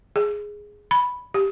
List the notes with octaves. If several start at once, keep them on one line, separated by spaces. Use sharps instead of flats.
G#4
B5
G4